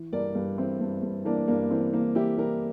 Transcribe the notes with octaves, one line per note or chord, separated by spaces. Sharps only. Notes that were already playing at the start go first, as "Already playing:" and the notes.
Already playing: E3
G2 A#4 D5
G2
E3 C4 E4
G2
G2
E3 A#3 D4
G2 A#3 D4
E3 C4
E3 A#3
E3 E4 G4
E3 G4 A#4